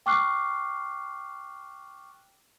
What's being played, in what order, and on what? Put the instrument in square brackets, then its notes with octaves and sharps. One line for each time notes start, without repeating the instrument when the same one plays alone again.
[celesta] G5 C#6 D6 F6 F#6 C7